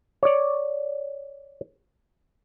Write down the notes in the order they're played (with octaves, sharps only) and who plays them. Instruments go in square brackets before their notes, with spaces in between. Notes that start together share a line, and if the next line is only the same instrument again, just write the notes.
[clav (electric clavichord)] C#5 D5